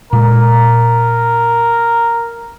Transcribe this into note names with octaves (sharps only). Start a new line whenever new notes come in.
A#2 G#3 A#4